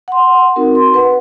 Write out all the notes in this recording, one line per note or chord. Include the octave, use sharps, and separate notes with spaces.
F#5 C6
C4 D#4 F#4 A#4
C6
B4 F#5